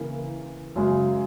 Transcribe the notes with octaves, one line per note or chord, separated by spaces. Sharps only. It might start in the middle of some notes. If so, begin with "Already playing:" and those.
Already playing: C#3 E3 A#3
F#2 C#3 G#3